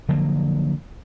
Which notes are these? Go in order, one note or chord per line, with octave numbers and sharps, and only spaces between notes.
D3 F3 F#3 A#3